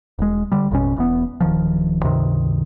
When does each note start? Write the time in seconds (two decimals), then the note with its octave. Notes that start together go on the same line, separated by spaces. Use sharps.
0.19 E1 G#3
0.52 D3 G3
0.71 A1 F2 B2 C#4
0.96 E1 E2 B3
1.41 D1 D#3 F3
2.03 C#2 G2 C3 D#3